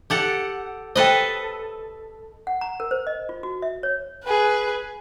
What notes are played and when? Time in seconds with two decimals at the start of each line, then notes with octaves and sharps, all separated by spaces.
0.10 G4 A4 F#5
0.95 A4 B4 C5 D#5 G5
2.47 F#5
2.61 A#5
2.80 A#4
2.91 C5
3.07 D#5
3.29 F4
3.43 F#4
3.62 E5
3.83 C#5
4.24 G#4 B4